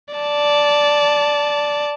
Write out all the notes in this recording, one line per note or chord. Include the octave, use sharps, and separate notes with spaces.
D5 A5